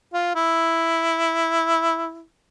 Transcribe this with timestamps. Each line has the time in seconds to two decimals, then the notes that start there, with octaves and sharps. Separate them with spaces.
0.13 F4
0.35 E4